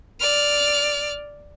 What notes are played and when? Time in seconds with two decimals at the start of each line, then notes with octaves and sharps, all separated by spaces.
0.20 D5 F6